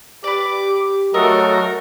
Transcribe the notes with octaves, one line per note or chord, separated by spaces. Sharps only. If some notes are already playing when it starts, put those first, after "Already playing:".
G4 B4 D5 D6
F#3 A3 F#4 A4 A#4 D#5